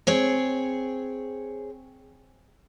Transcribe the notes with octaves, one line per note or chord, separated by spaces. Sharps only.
C4 G#4 C#5